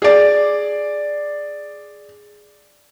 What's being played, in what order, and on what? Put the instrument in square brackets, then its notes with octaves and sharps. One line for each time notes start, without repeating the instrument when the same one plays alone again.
[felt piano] G#4 D5